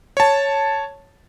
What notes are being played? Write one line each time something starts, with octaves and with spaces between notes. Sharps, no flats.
C#5 A5